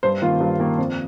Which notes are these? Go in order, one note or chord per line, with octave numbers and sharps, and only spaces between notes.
G2 C5
D#3 A#3 F4
G2
D#3 A#3
F2